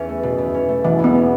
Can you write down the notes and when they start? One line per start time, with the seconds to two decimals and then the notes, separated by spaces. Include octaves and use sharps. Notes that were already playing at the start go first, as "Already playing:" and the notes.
Already playing: E2 C#4
0.09 A3
0.23 B2
0.38 E2
0.54 C#4
0.68 A3
0.84 B2 E3
0.99 E2
1.04 B3
1.15 C#4